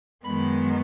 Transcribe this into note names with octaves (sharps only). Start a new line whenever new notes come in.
F#2 D#3 G#3 B3 B5